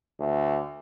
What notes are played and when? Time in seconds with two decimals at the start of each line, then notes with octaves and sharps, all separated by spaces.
0.19 D2